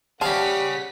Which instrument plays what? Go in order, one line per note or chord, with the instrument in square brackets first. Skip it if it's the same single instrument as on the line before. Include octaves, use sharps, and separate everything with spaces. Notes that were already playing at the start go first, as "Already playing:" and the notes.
[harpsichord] G3 F5 [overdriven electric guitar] G#4 C#5 [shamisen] C5 A5 [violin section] F#5 B6